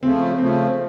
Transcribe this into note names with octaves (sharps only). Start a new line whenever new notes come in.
C#3 F3 A3 C4
C#3 F3 A3 C4